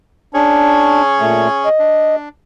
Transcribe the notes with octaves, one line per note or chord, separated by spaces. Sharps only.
C#4 D4 G#4 C#5
A#2 A3
D#5
D4